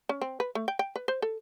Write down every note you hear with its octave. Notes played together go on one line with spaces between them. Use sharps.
C#4
C4
B4
A3
G5
G5
B4
C5
A4